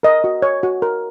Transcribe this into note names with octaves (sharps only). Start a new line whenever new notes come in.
A#4 D#5
F#4
C#5
F#4
A#4